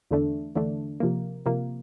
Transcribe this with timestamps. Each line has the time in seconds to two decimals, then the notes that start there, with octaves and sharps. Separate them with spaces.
0.11 E2 D3 A3 D4
0.56 E2 D3 A3 D4
1.00 C3 F3 A#3
1.46 C3 F3 A#3